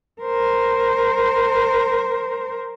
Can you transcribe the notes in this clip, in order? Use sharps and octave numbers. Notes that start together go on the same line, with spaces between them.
A#4 C5